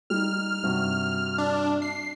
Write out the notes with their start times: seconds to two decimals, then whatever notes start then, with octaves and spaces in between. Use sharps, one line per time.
0.10 G3 D#4 F6
0.63 G2 C3 F#4
1.38 D4
1.82 C7